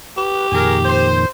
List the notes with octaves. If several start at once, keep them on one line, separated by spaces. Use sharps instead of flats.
G4 B4
F2 A#2 D#3 G#4 A#4
C5